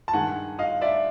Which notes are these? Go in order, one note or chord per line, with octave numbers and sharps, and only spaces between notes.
A5
G2 D#3 G#3 F#5 G#5
D#5 F5
D5 E5